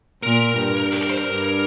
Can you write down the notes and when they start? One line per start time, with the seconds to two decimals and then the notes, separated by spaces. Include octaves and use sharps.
0.23 A#2 A#4
0.57 G2
0.93 G4
1.00 A#4
1.10 C5
1.18 A#4
1.27 G2